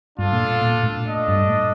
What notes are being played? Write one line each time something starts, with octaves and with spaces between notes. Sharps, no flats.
G2 D4 F4 A4
A#2
A#2
A2
D4 A4 D#5
G2
A2